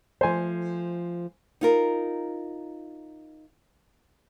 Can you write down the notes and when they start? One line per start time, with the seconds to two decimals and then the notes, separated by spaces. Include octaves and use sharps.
0.21 F3 A3 C5 G#5
1.61 D#4 F4 A#4